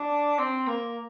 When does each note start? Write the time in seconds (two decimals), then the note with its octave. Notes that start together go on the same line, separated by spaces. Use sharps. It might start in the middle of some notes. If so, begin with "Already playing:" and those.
Already playing: D4
0.39 C4
0.67 A#3